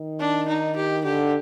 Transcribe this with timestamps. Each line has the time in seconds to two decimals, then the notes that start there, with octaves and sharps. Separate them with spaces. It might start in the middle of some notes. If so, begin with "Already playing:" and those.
Already playing: D#3
0.20 D4
0.48 D#4
0.76 G4
1.05 D3 G4